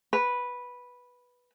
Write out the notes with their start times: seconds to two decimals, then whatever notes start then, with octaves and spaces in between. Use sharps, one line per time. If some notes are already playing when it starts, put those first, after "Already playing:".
0.13 B4